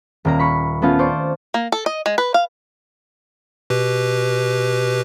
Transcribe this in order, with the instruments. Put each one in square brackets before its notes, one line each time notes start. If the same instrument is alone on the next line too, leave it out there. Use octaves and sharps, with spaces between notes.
[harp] D#1 A#3 A#5
B5 C#6 C#7
A3 B3 C#4 F4
C5 D5 C#6
[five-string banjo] A#3
A4
D#5
G#3
B4
F5
[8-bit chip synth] B2 G4 B4